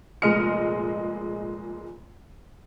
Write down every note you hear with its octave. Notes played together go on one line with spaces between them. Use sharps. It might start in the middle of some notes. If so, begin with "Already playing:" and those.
F1 A#2 G#3 D#5 F6 C#7